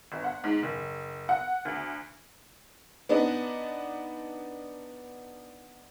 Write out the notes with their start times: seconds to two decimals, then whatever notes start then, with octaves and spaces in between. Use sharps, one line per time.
0.12 G1
0.24 F#5
0.44 G#2
0.63 F#1
1.29 F#5
1.65 D2
3.09 B3 D4 D#4